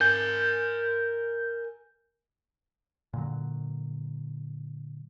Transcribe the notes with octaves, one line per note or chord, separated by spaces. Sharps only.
A#4 G#5 G6
A#2 D3 F#3